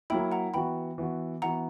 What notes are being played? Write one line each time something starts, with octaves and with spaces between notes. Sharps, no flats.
F#3 A#3 E4 G5 B5
F#5 A#5
E3 B3 F#4 G5 B5
E3 B3 F#4
E3 B3 F#4 F#5 A#5